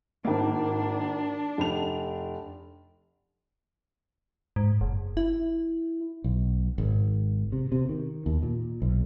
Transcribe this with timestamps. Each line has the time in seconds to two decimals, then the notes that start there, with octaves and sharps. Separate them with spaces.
0.25 G#1 A#3 D4
1.58 F1 F7
4.56 G#2
4.81 F#1
5.17 E4
6.24 B1
6.78 G#1
7.52 C3
7.72 C3
7.89 D#3
8.26 D#2
8.43 A#2
8.82 B1